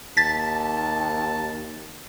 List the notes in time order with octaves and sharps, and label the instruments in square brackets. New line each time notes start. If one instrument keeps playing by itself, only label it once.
[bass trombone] D#2 [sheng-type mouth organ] A5 [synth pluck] A6 B6